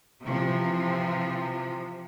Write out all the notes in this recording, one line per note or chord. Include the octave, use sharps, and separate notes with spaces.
C3 E3 F3